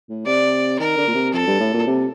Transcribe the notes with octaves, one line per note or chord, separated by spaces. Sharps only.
A2
C3 D5
D#3 A#4
D3
A#2
C3
F2 A4
G2
A2
A#2
C3